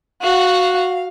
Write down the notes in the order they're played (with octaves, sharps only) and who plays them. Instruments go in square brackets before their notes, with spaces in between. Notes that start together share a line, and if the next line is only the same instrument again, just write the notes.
[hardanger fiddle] F#4 F#5 [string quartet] F5